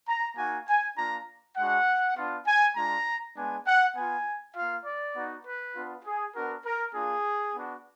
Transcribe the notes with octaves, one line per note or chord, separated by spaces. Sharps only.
A#5
A#3 D#4 F#4 G#5
G#5
A#3 D4 F4 A#5
G#3 D4 F#4 F#5
B3 D4 F4
G#5
G#3 D4 F4 A#5
G#3 B3 D4 G#5
F#5
B3 F4 G#5
A#3 F4 F5
D5
B3 D#4 F#4
B4
B3 D4 F4
G#4
B3 D4 F#4 A#4
A#4
A#3 D4 F4 G#4
B3 D4 F#4